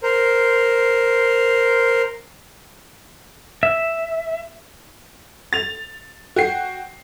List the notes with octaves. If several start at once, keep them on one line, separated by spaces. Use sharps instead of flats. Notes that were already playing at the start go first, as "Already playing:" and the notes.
A#4 C5
E5
A6 F7
F#4 G5 C7